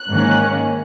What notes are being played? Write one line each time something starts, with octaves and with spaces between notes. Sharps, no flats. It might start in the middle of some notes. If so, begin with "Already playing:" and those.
Already playing: F#6
G#2 D#3 A#3 C#4